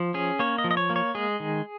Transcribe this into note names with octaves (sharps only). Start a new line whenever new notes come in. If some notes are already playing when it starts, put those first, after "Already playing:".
Already playing: F3
C#4 G#4
A#3 C#5
D#5
F3
D#5
C#5
A#3
C#5
G#3 G#4
D#3